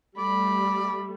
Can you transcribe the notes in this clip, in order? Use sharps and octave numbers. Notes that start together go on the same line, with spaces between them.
G3 A3 D5 B5